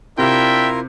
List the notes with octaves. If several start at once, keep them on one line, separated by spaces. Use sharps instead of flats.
C3 D4 E4 F4 A#4 E5 G5